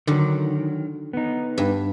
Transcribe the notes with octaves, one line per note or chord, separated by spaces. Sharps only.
D3 D#3 F#3
B3 D#4
G2